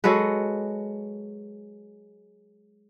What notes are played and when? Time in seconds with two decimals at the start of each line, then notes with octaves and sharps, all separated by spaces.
0.04 F#3 G#3 A4 B4